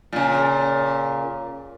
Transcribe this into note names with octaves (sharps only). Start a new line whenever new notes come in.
A#2 C#3